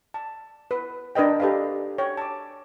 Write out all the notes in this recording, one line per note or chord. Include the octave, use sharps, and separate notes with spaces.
A5
B4
D4 A#4 B4 D#5 G5
G4 A4 B4 D#5 F5
C#5 G5
A5 D6